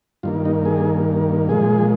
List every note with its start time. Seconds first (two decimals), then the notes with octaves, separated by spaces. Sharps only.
0.23 G2 D#3 A#3 F4
0.45 D#4
0.65 G#4
1.49 A#2 F3 G#3 G#4